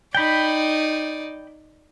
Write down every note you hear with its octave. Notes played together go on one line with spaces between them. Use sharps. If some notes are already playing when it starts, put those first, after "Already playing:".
D#4 D5 G5 B5